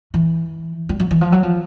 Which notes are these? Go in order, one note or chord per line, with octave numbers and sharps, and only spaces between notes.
E3
G3
F#3
E3
F3
F#3
F3